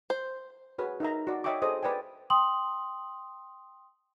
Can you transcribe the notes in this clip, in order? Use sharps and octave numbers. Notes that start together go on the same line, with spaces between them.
C5
F#4 G#4 B4 C#5
D#4 A#4 E5 A#5
F#4 D5
C#5 D#5 E5 G5 C#6 D6
G#4 A4 C5 D#5 D#6
B4 D5 G5 G#5
G5 C6 D#6 F#7